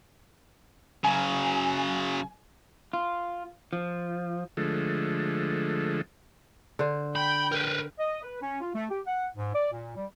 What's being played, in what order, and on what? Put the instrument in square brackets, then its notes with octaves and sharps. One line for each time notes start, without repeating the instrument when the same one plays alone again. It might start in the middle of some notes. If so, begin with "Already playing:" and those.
[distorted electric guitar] C#3 F#3 [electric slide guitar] G#5
[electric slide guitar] F4
F3
[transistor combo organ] D3 F3 G#3 A3
[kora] D3 C5
[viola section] G5 [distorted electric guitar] B5
[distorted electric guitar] A#4 B4
[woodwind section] D#5
B4
C#4
F4
A3
G4
F#5
G#2
D5
A#2
G3